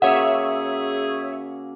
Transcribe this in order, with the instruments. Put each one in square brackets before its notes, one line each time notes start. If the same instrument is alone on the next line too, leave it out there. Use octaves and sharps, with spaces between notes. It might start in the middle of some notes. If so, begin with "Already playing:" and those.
[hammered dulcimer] C#3 A#3 F#4 [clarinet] G#4 [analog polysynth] C#5 E5 [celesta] F#5